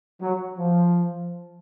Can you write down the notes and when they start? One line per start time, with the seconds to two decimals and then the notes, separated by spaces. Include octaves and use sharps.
0.22 F#3
0.58 F3